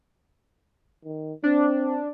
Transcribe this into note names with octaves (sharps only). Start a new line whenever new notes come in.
D#3
C4 D4